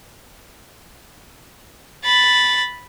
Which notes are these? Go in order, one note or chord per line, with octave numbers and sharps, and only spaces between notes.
B5 A6